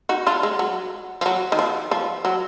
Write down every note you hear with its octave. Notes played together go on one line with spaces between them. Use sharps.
D#4 F#4
D4 F4
G#3
F#3
F3
F#3
D#3
F3
F3
F#3